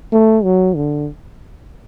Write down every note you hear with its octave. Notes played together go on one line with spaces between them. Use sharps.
A3
F#3
D3